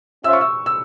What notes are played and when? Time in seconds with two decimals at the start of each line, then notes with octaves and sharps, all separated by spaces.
0.24 C#4 F4 C5 E5 E6
0.33 C#6
0.41 E6
0.66 E6